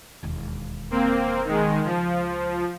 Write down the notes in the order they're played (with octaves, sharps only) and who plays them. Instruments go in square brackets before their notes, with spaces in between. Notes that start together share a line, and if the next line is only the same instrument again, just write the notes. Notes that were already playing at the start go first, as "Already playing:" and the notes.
[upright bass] E1 D#2
[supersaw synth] A#3 C4
D#3 G#3
[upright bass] C#2 [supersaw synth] F3